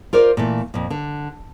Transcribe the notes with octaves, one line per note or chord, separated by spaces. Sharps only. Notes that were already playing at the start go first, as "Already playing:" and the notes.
F4 A#4 C5 D5
A#2 E3 A3
F2 A#2
D3